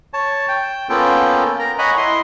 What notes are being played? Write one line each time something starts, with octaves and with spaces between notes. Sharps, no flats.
C#5 A5
G5
A#3 B3 C#4 F4 A4 G5
A#4 A#5
C#5 D#5 F#5 G#5 A#5 B5
E4 D#5 C6